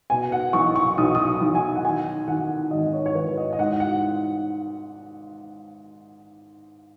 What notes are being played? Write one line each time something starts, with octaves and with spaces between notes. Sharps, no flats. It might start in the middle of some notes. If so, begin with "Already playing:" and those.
B2 G#5
F#5
B1 C#6
C#6
B1 D#6
D#6
B1
G#5
F#5
D#3 G#5
D#3 F#5
G#1 D#5
C#5
C#5
G#1 B4
D#5
D#5
G#2 F#5
F#5